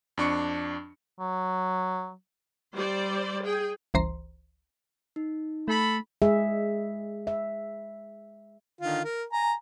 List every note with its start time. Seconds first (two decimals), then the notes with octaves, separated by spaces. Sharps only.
0.18 F2 D4 C#6 C#7
1.20 F#3
2.75 G3 C5 D5
3.44 G#4 G5
3.94 G1 C#2 E3 C5 A#5 C6
5.16 D#4
5.68 A3 A4 B5
6.22 G#3 G#4 E5
7.27 E5
8.81 D3 D#3 F4
9.05 A#4
9.33 G#5 A#5